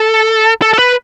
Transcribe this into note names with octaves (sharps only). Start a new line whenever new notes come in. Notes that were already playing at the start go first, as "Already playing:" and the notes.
Already playing: A4
A4
A4
B4